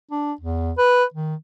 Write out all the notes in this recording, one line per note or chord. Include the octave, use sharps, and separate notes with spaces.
D4
E2
B4
D#3